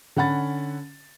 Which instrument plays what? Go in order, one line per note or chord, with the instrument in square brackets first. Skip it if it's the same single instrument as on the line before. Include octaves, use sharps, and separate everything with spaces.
[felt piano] D3 C#4 F#5 B5 A6